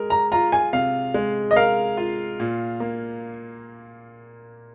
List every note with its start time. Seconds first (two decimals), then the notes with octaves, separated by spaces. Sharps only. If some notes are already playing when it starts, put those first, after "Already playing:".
Already playing: G#3 A#4
0.10 A#5
0.32 F4 A#5
0.52 G#5
0.73 C3 F5
1.14 G#3
1.51 D#5
1.56 A#4 F5
1.97 F4
2.40 A#2
2.80 A#3